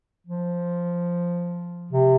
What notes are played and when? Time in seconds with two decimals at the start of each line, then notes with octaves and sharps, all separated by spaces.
0.27 F3
1.93 C3